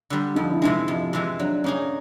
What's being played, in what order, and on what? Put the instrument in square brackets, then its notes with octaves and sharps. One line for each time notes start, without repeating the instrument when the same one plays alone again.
[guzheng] D3 G3
[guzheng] F2 [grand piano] D#4
[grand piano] E4
[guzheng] C3 E3 G#3 [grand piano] D#4
[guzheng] F2
C3 E3 G#3
[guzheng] F#3 [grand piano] D4
[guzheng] A#3 D#4 G#4 [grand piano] C#4